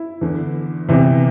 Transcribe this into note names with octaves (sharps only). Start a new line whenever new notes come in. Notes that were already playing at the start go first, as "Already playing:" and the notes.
Already playing: E4
E2 D3
E2 C3 E3